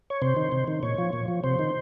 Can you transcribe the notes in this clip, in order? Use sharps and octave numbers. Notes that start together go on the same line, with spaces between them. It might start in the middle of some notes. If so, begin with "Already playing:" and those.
C#5
C3 C5
D#3
C3
D#3
A#2 C#5
F3
A#2
F3
C3 C5
D#3